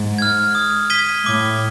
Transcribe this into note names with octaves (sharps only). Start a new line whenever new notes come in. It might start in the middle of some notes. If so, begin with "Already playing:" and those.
Already playing: G#2
F6 G#6
D#6
G#6 B6 D#7 G7
A2 D6